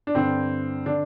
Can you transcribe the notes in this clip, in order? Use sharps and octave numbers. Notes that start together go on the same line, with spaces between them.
D4
G2 D3 C4
D3 D4